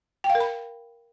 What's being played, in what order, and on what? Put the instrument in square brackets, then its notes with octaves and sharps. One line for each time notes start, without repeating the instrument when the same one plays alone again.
[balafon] G5
F5
A#4
B5